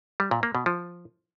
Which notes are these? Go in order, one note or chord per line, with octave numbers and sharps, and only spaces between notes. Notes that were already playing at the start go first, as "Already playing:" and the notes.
G3
A#2
A#3
B2
F3